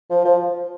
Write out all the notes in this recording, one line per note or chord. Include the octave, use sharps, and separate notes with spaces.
F3
F3